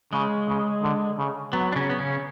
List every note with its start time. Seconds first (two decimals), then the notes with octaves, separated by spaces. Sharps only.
0.13 C#3 G#3
0.48 C#3
0.82 D3
1.18 C#3
1.53 F#3 B3
1.72 D4
1.76 C#3 C#4
1.89 B3
1.99 C#3 C#4